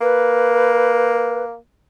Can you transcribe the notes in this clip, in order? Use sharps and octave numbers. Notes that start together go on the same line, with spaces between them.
A#3 B4